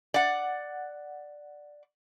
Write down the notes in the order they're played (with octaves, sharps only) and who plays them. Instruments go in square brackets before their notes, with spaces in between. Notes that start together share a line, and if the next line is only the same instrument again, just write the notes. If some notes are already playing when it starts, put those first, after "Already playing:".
[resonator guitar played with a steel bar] D5 F#5